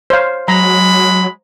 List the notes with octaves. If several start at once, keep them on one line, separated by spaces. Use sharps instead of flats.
C5 C#5 F5
F#3 G#3 A#5 B5